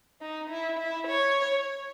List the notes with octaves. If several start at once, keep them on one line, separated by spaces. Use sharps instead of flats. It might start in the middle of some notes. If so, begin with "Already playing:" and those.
D#4
E4
E4
C#5